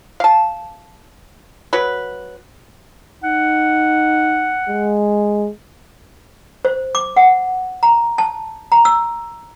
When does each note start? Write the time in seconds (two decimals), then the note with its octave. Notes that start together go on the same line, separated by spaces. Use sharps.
0.20 F5 A5
1.73 F#3 B4
3.23 D#4 F#5
4.69 G#3
6.65 C5
6.95 D6
7.17 F#5
7.83 A#5
8.18 A5
8.72 A#5
8.85 E6